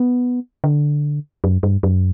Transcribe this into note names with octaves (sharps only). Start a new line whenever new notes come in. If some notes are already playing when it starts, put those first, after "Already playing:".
Already playing: B3
D3
F#2
G2
F#2